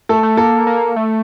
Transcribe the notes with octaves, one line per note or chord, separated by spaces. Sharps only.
A3 A4
A3
A#3 A4
A#3
A3